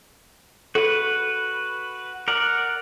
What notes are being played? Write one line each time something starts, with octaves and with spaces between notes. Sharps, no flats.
F#4 A4 B4
A#4 D5 F#5